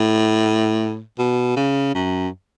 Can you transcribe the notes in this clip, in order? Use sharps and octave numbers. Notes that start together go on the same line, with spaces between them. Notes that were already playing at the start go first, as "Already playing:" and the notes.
Already playing: A2
B2
C#3
F#2